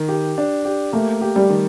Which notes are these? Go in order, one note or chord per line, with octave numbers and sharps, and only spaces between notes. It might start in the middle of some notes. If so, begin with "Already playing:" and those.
Already playing: D#3
G4
D4
G4
A3 A#3
G4
G3
D#3